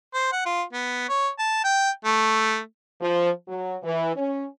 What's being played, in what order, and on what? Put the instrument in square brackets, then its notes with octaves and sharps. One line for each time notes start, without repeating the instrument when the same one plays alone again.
[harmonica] C5
F#5
F4
B3
C#5
A5
G5
A3
[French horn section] F3
F#3
E3
C#4